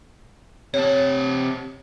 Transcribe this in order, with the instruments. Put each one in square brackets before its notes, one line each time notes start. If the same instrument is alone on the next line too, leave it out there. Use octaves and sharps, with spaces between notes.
[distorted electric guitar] C3 A5 [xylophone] C#5